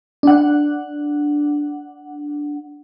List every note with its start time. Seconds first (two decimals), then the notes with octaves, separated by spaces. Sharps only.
0.23 D4 F#5